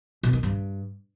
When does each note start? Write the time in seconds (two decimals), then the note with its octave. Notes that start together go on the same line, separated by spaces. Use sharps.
0.23 B2
0.33 D#3
0.43 G2